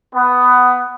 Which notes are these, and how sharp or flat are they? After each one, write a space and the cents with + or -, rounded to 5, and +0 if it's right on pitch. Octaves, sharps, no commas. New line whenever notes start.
B3 +10